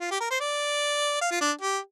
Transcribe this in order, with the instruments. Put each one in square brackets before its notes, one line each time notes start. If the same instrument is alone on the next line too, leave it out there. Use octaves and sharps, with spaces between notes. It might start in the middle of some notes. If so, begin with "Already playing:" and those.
[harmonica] F4
G4
A#4
C5
D5
F5
F4
D4
G4